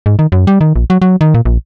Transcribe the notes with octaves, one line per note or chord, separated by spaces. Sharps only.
G#2
D#3
F#2
G3
D#3
A#1
F#3
F#3
D#3
A#2
A#1